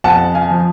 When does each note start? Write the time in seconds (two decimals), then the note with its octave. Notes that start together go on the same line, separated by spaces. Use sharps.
0.04 F2 F#5 A5
0.34 F5 G#5
0.50 F3